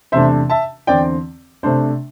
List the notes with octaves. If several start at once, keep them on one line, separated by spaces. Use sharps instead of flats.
E2 C3 A3 D4 C5 E5
E5 A5
E2 D3 C4 D5 G5
C3 A3 D4 C5